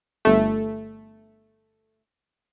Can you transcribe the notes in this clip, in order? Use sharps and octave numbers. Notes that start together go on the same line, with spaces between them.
G1 A3